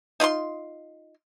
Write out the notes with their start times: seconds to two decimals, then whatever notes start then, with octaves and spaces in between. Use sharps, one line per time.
0.20 D#4 F4 F#5 C6